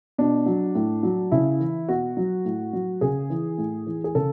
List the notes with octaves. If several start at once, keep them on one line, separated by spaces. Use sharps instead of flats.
B2 D4
F#3
A2
F#3
C#3 E4
E3
B2 F#4
F#3
A2
F#3
C#3 G#4
E3
A2
E3
G#4
C#3 A4